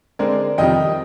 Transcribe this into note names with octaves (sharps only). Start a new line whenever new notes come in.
D3 G#3 C4 A#4 D5
F2 C3 D#3 G3 D#5 G5